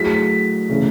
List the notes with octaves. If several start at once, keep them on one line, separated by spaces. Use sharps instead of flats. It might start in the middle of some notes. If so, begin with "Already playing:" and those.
Already playing: F#3 A3 E4 G#4 B6
C#3 E3 A3